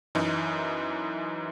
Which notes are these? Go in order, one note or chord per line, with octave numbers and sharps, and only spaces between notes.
F#2 E3 D#4